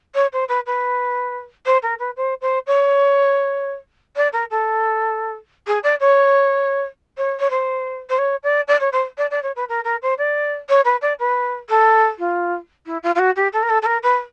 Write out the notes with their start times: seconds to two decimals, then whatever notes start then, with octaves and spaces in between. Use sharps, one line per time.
0.15 C#5
0.33 C5
0.48 B4
0.66 B4
1.66 C5
1.82 A#4
1.99 B4
2.17 C5
2.41 C5
2.67 C#5
4.16 D5
4.33 A#4
4.51 A4
5.67 G#4
5.83 D5
6.00 C#5
7.17 C#5
7.40 C#5
7.50 C5
8.09 C5
8.18 C#5
8.43 D5
8.68 D5
8.80 C#5
8.92 C5
9.18 D5
9.31 D5
9.43 C#5
9.56 B4
9.69 A#4
9.84 A#4
10.02 C5
10.18 D5
10.69 C#5
10.85 B4
11.02 D5
11.19 B4
11.69 A4
12.18 F4
12.86 E4
13.03 F4
13.15 F4
13.19 F#4
13.36 G4
13.53 A4
13.63 A#4
13.69 A4
13.82 A4
13.86 A#4
14.03 B4